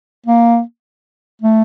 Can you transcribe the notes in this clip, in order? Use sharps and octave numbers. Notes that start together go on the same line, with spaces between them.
A#3
A3